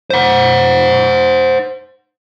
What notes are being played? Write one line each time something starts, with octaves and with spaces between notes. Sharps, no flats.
C5 F#5